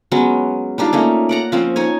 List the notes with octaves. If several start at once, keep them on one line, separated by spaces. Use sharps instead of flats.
F#3 G#3 B3 C#4
G3 D4 D#4 F4
A3 A#3 C#4
D5 F#5 A#5
F3 C4 C#4
D#4 C#5 G#5